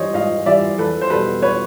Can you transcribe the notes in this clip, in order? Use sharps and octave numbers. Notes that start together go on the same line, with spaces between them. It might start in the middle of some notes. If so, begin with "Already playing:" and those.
Already playing: E3 G3 C5 C#5 D#5
G#2 D#5 F5
E3 G3 D5 E5
E2 A4 B4
C5
B2 G3 A4 B4
B4 C#5